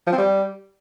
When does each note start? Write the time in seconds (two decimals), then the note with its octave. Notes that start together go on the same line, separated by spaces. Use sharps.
0.07 F3
0.13 C4
0.18 G3